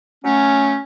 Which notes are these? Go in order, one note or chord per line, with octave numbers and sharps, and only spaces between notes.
F#3 A3 C#4